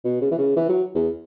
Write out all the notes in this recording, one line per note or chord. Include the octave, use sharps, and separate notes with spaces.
B2
C#3
E3
C#3
E3
F#3
E2